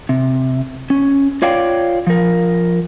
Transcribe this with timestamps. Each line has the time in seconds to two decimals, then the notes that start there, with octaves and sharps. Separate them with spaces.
0.09 C3
0.90 C#4
1.42 F4 C#5 D5 F5 G5
2.07 F3 A#4